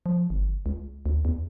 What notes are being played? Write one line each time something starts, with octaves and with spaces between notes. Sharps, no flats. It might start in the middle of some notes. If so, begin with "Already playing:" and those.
F3
G1
C#2
D2
E2